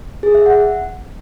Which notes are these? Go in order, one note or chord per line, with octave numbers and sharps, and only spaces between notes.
G#4
E5
F#5